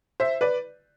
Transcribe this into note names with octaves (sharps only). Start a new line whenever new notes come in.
C5 E5
B4 D5